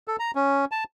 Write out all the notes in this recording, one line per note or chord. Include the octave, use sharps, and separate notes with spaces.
A4
A#5
C#4
A5